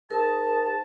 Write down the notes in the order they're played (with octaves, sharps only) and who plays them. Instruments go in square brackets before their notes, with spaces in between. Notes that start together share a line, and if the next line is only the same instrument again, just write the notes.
[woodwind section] G#2 A5 [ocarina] G#4 [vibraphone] A#4